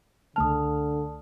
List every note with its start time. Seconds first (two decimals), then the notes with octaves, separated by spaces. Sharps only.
0.36 C#2 D3 A3 A5 D#6 F6